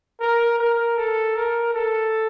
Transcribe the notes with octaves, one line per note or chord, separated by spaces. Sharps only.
A#4
A#4
A4
A#4
A4